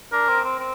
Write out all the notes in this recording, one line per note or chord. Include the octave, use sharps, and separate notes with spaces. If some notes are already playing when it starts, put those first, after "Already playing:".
D4 A#4
C4
C4
C4